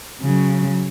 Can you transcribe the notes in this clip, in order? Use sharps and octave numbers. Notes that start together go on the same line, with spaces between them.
C#3 F#3